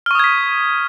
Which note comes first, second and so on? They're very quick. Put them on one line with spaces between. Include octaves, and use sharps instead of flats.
F6 C#6 D#6 G#6 B6